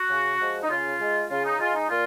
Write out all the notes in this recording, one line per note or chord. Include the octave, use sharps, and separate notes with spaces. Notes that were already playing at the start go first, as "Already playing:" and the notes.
Already playing: F#4
C#3
F3 G#3
D#4
C#3 F4
G#3
C#3 F4
D#4
G#3 F4
D#4
A#2 F4